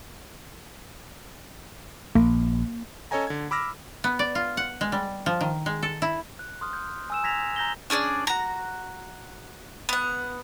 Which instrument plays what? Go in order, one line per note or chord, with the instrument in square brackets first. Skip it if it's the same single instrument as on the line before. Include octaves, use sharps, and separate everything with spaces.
[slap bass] A#1 [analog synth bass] A#3
[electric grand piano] C#4 A4 C#5 D#5 G#5 A#5
D3 G#6
B5 D6 E6 F6 A#6
[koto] B3
D5
F4
F#5
G#3
G3
F3
D#3
G#3
A4
E4
[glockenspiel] F#6
C6 D#6 F6
G6
G#5 E6 E7
A#5 G#6 A#6 B6 F7
A#5 G6 A#6 G7
[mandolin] C#4 D4 G#4 D5
F#4 A#5
B3 F#5